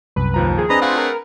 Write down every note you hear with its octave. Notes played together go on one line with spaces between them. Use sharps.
C2 F#2 B4
D#2 F3 A#5
G#4
C4 D4 B4 D#5 A#5 B5 D#6
A3 F4 G#4 F#5
A#4